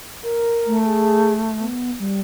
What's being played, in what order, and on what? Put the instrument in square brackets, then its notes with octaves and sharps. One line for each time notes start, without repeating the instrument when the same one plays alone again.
[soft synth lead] A#4
[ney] A3
[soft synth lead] G#4
B3
G3